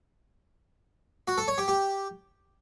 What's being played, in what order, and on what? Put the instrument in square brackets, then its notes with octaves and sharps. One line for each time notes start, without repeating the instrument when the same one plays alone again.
[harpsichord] F#4
A4
C#5
G4
G4